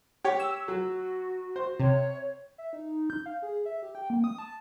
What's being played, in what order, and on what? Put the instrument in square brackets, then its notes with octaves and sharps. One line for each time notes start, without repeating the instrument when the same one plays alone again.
[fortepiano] G4 C#5
[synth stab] E6
[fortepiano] F#3 [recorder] F#4
[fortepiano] C5
[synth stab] C3 [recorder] C#5
[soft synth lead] E5
D#4
G6
F5
G#4
E5
G4
G5
A#3
D#6
A5